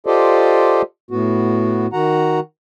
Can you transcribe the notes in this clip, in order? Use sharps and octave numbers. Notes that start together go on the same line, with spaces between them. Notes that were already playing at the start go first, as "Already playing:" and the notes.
F4 G4 A4 C5 D5 D#5
A2 B3 F#4
D#3 F#4 F#5 A#5